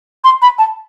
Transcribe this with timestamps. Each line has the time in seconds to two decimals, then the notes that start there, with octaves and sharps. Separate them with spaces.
0.24 C6
0.42 B5
0.59 A5